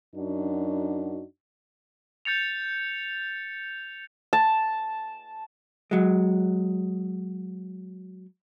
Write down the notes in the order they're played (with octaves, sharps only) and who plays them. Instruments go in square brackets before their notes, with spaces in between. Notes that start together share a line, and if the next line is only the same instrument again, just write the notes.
[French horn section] F#2 D4 D#4 F#4
[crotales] G6 A6 C#7 F7
[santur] A5
[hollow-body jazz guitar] F#3 G#3